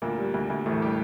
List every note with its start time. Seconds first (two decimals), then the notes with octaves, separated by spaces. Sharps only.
0.02 D2 A#2 A#3
0.18 G3
0.34 D2
0.50 D2
0.66 E1 A2 A3
0.82 G3 G4